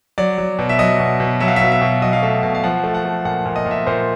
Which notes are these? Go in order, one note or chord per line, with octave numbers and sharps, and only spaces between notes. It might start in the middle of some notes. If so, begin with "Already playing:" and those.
F#3 D5
F#3
B2
E5
F#3 D#5
B2
B2
F#3 E5
F5
E5
B2 F5
E5
B2
F#3 D#5
F5
A3 E5
B2 F5
F5
F3 F#5
A3
F#5
A3
A#2 F#5
A#2
D#5
A#2
E5
A#2 C5